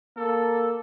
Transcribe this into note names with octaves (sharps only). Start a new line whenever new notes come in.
A#3 A4